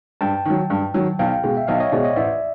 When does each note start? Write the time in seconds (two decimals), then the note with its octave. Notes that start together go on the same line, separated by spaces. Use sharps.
0.21 G2 G5 A5
0.45 D#3 F#3
0.70 G2
0.94 D#3 F#3
1.19 B1 F5 G5
1.43 B2 G#3
1.57 E5
1.67 B1 D#5 F5
1.80 C#5 D#5
1.92 B2 G#3 C5 D5
2.04 C#5 D#5
2.16 A1 D5 E5